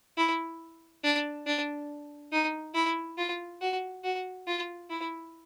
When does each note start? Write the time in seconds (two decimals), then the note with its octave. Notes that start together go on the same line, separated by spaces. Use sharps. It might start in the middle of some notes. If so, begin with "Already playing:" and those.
0.17 E4
1.04 D4
1.47 D4
2.32 D#4
2.75 E4
3.18 F4
3.61 F#4
4.04 F#4
4.47 F4
4.90 E4